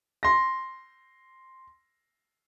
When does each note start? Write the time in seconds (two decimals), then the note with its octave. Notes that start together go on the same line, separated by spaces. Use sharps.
0.23 C6 A#6